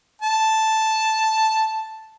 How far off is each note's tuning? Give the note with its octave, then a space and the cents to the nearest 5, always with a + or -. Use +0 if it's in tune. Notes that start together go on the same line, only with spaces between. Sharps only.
A5 +0